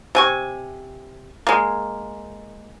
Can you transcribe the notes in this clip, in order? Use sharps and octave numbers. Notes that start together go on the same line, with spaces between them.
C3 G#5 C#6
G#3 A#3